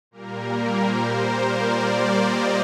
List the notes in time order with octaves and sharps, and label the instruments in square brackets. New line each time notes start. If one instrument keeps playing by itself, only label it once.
[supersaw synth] A#2 G3 A#3 A#4
C5
D5
D#5